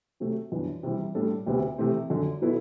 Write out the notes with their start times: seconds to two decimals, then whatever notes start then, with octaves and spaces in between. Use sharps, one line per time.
0.20 C3 F#3 A3
0.52 F#2 E3 B3 D4
0.83 C3 E3 G3
1.15 A2 G3 D4 A4
1.47 D2 C3 F#3 B3
1.78 C3 E3 A3 C4
2.10 F#2 D3 F#3
2.42 B2 F#3 B3 E4 A4